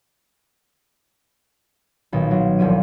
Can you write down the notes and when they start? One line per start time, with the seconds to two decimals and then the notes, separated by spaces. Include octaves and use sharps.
2.12 B1 A#2 D#3
2.31 F#3 F4
2.59 E1 C2 F3 D#7